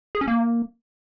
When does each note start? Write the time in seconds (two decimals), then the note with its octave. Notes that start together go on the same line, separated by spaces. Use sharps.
0.15 G#4
0.21 C#4
0.28 A#3